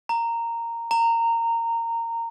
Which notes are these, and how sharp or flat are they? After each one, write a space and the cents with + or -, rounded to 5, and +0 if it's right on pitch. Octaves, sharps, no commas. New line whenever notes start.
A#5 -10
A#5 -20